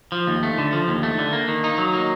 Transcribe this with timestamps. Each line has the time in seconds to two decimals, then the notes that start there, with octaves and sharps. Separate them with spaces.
0.12 F3
0.27 D#2
0.43 A3
0.58 D3
0.73 F3
0.88 D#2
1.03 A3
1.18 D3
1.33 A#3
1.48 D#3
1.64 D#4
1.78 F#3
1.94 A#3